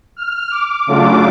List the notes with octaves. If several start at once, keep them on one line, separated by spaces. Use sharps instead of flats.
F6
D6
C#3 F#3 A3 D4 F4 D6